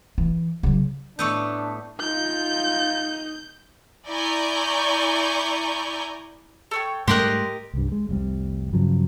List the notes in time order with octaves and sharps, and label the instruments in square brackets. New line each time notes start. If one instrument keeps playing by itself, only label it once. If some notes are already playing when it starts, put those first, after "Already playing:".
[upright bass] E3
C#3 F#3
[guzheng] A2 A3 B3 [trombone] D4 [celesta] C#6 E6 G6
[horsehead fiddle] D#4 [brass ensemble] F4 [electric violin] G6
[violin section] E4 D5 G#5 A#5 C#6 G6
[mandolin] A4 C#5 G5
[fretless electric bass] G#2 G3 A3 [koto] G4 A#4 D#5 [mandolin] C6 F#6
[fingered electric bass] C2 G2
G#3
F1 C2 C3 G3
G2 C#3 F3 F#3